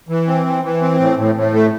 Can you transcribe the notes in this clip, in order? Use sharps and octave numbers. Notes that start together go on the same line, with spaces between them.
E3
C4
E3
E3
C4
A2
A2
A2
A3